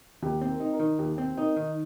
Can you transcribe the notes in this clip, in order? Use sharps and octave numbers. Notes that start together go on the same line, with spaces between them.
D#2 G4
C4
A#4
D#4
A#4
D#3
D#2 G4
C4
D#4 A#4
D#3